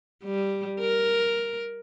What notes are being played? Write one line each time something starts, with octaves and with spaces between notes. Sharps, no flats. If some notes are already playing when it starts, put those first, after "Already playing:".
G3
A#4